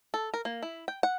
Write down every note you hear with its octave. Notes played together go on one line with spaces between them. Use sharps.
A4
A#4
A#3
E4
G5
F#5